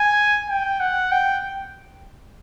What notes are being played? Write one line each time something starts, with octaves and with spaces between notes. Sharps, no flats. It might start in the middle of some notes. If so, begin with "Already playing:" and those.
Already playing: G#5
G5
F#5
G5